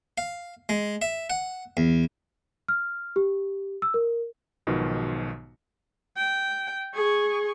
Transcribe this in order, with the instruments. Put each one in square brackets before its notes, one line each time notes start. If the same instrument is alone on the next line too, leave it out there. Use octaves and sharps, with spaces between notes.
[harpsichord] F5
G#3
E5
F#5
E2
[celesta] F6
G4
E6
A#4
[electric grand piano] B1 G#2 B2 D#3 F3
[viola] G5
G#4 C#6